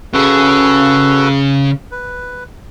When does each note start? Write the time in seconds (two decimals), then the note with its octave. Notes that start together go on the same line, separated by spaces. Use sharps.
0.14 C#3 F#4 G#4 A4 B4
1.92 B4